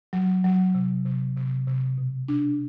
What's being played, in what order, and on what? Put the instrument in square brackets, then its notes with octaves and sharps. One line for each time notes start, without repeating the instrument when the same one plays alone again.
[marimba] F#3
F#3
C3
C3
C3
C3
B2
D4